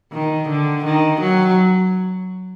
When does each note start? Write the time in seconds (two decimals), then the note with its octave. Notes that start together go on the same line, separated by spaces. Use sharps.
0.13 D#3
0.49 D3
0.85 D#3
1.21 F#3